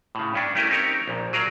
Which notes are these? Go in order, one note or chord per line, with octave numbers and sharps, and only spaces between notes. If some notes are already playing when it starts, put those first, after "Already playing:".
A2 C#3
G2 C#4 D4
A3 C#4 E4 G4 A#4 D#5
C4 C#4 D#4 G4 A#4 C#5
A#1 A#2
F#3 G#4 A#4 D5 F5